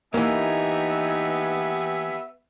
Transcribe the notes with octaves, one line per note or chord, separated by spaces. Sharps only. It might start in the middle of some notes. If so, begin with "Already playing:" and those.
E3 A#3 B3 D#4 G4 E5 G#5